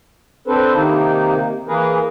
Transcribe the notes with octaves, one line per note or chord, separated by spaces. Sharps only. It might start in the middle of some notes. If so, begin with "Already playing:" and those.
C4 D4 A4 B4 C5
C3 D#3 A#3 D#4
E3 A#3 G#4 A#4 B4